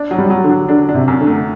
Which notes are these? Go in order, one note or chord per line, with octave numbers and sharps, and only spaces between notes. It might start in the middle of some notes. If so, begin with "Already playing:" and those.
Already playing: D4
F#3
G3
F#3
D3
F#3
D3 D4
D4
C3
F#2
D3
A3